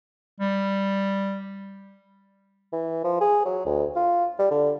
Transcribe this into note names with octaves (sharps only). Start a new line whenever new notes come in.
G3
E3
F3
G#4
F#3
D2
F4
G3
D3